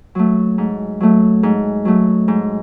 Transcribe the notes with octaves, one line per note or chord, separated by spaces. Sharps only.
F#3 A3
G#2
F#3 A3
G#2
F#3 A3
G#2